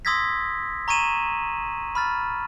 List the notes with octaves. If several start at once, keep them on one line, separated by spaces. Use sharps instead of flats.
C6 D#6 E6 G#6 A#6 B6
A#5 C#6 G#6 D#7 E7 F#7
B5 F6 A6